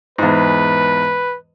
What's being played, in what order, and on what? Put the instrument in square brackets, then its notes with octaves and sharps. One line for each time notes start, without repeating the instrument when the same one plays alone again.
[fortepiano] E2 G#2 [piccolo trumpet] B4